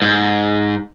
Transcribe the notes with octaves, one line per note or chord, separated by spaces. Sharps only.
G#2